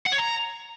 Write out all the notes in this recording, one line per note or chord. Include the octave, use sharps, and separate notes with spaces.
F#5
C#5
A#5